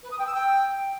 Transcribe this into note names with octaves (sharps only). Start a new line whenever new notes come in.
B4
D#6
G5
E6
G5